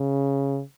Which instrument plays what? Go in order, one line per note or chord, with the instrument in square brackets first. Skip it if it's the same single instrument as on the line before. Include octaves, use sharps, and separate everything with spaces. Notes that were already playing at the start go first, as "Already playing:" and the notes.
Already playing: [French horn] C#3